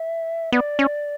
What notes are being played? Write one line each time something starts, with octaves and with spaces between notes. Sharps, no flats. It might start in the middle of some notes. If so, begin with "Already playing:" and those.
Already playing: E5
B3 D5
C#4